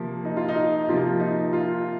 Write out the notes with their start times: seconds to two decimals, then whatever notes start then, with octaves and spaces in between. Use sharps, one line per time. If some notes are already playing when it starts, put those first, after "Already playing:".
Already playing: C3 F3 A#3
0.25 D#4
0.37 F4
0.48 D#4
0.88 C3 F3 A#3 F4
1.20 D#4
1.53 F4